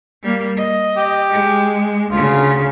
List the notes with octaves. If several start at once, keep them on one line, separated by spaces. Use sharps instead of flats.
G3 A#3
D#5
G4
G#3
D2 C#3 F4